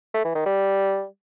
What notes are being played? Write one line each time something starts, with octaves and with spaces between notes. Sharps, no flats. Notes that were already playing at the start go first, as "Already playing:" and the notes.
A3
E3
D#3
G3